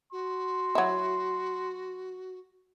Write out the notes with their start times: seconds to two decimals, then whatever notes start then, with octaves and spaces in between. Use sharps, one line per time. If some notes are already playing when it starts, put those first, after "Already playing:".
0.12 F#4 C6
0.75 F#3 E4